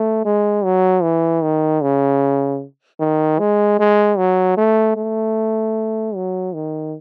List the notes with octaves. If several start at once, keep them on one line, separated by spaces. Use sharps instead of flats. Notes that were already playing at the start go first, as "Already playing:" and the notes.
Already playing: A3
G#3
F#3
E3
D#3
C#3
D#3
G#3
G#3
F#3
A3
A3
F#3
D#3